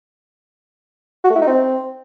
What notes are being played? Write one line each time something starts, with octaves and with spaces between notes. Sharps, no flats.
F#4
A3
E4
D#4
C4